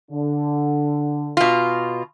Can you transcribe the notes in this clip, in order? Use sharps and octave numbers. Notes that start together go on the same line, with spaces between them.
D3
B2 F4